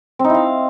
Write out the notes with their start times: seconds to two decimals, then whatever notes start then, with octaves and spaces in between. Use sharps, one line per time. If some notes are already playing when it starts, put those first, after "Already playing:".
0.19 C4
0.24 D#4
0.29 E4
0.34 F5